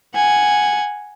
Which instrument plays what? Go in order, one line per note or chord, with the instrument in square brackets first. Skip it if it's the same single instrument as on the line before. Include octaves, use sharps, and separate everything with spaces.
[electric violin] F#5 G#5